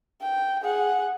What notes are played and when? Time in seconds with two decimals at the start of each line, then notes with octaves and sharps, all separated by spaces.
0.22 G5
0.62 G#4 F#5